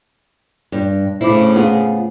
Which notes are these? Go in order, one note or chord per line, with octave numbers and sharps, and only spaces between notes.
G2
A2 C#3 E4 C5 B5 D6
B3 F4 G#4